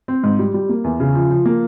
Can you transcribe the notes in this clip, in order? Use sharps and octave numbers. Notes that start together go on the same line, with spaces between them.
C4
G#2
G3
G3
A#3
E2
C#3
F3
F3
A#3